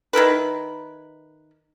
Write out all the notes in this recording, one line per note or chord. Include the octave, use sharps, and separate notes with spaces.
D#3 E4 A#4 B4